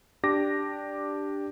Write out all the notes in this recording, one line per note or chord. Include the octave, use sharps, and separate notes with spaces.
D4 G4 D6 A#6